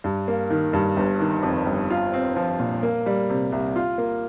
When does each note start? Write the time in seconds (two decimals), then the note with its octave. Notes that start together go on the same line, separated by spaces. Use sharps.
0.04 G2
0.28 A#3
0.50 D#3
0.73 G2
0.97 G1
1.20 D#3
1.43 F2
1.66 G1
1.90 F4
2.13 C4
2.36 F3
2.59 A#2
2.83 A#3
3.06 G3
3.30 C3
3.52 C2
3.76 F4
3.98 A#3